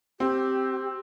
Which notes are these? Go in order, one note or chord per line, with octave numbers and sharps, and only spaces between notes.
C4 G4